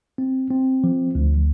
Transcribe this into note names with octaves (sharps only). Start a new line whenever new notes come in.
C4
C4
F3
D2